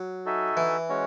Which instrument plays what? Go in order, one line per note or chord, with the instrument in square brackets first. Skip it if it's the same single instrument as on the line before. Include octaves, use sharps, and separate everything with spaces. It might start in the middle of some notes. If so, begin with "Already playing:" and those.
Already playing: [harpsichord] F#3
[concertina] D#4 F#4 A4 E5 G#5
[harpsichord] E3
[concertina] G#3 C#4 F#4 C#5